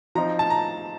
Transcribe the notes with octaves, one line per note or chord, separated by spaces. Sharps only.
F3 C4 D#4 A#5
A5
A#5